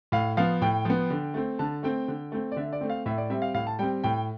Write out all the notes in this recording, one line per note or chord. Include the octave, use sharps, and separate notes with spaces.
A2 F5
F3 B3 F5
A2 G5
F3 B3
D3
A3 C4
D3 A5
A3 C4 G5
D3
A3 C4
D5
D3 E5
D5
A3 C4
F5
A2 E5
D5
G3 C4 E5
F5
A2 F5
A5
G3 C4 G5
A2 G5